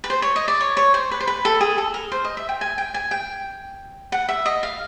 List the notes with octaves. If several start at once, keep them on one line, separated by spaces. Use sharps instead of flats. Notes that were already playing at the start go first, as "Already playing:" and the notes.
B4
C5
C#5
D#5
D5
C#5
C#5
C5
B4
C5
B4
A4
G#4
A4
A#4
C5
D#5
E5
G5
G#5
G5
G#5
G5
F#5
E5
D#5
F5